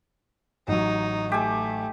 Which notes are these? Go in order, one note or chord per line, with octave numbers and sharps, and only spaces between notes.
A1 F#3 D#4
A3 G4 G#5